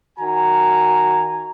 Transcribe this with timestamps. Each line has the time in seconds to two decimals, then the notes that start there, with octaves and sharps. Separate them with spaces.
0.19 D#3 F#4 G#5 A#5